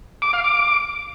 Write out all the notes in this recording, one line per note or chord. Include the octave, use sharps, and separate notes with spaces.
D6
F5
D6